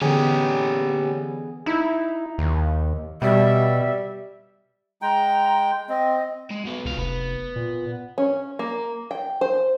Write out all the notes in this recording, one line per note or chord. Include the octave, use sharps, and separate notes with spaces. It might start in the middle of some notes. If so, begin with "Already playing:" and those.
D3 E3 B3 C#4 G4 G#4
D#4 E4
D#2
B2 G3 E5
G#3 G5 A#5
C4 D#5
G#3
F#3 B3
C#2 C3 F5
F1 B3
A#2
C#4
A#3
G5
C5